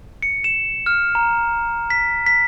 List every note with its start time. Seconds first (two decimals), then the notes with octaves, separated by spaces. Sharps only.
0.22 C#7
0.44 E7
0.86 F6
1.15 A#5
1.90 B6
2.26 B6